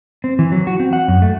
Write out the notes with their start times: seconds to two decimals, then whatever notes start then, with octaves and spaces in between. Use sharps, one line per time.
0.24 C4
0.39 E3
0.52 F#3
0.67 F#4
0.80 C4
0.93 F#5
1.08 F#2
1.22 A3